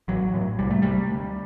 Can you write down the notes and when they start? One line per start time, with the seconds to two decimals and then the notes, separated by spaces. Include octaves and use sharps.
0.08 A1 F#3
0.34 A2
0.59 C2 G3
0.70 A3
0.82 C3 G3
1.11 D2